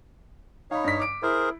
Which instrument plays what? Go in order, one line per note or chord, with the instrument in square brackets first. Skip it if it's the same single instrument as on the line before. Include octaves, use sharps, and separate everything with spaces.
[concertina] D#4 C#5 [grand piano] F5 B5
[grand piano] G2 B6
D6 D7
[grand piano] E4 [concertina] G#4 A#4 C5